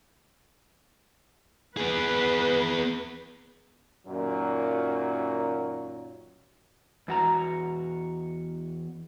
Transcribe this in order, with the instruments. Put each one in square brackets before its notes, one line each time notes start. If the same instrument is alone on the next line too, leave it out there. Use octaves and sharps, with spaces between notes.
[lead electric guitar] B3 G#4 [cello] B4
[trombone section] F#2 A#2 D#3 F#3
[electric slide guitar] E2 F#4 A#5